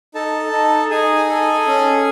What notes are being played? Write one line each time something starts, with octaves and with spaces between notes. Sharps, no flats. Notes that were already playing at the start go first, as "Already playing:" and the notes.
D#4 A4 A5
D#4
D#4 G#4 G#5
A4
C#4